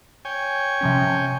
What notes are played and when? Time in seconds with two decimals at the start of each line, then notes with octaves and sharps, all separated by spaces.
0.25 C#5 G5 G#5
0.81 C3 F3 C#4